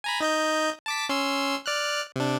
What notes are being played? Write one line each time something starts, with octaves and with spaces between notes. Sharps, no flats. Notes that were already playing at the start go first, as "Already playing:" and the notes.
G#5 A#5 B5
D#4 D#5 G6
A5 D6 B6
C#4 C6 E6
D5 F6 F#6
C3 D4